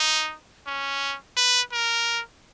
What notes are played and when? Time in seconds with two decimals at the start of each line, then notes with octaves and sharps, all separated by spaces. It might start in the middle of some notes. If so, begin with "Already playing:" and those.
Already playing: D#4
0.67 C#4
1.37 B4
1.72 A#4